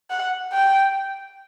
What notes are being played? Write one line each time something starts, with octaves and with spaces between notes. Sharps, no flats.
F#5
G5